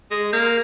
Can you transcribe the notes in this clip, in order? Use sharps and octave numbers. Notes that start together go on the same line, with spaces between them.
G#3
A#3